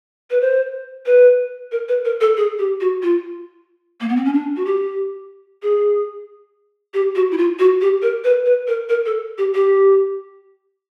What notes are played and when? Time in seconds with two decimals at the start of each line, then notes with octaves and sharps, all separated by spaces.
0.31 B4
0.41 C5
1.06 B4
1.72 A#4
1.88 B4
2.05 A#4
2.21 A4
2.37 G#4
2.59 G4
2.80 F#4
3.03 F4
4.01 A#3
4.09 B3
4.16 C4
4.25 C#4
4.33 D4
4.56 F#4
4.65 G4
5.63 G#4
6.94 G4
7.15 F#4
7.31 E4
7.38 F4
7.59 F#4
7.81 G4
8.02 A#4
8.24 B4
8.46 B4
8.67 A#4
8.89 A#4
9.06 A4
9.38 G4
9.55 G4